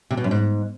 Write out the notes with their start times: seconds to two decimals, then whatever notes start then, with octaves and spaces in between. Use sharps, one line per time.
0.11 C3
0.17 B2
0.24 F#2
0.31 G#2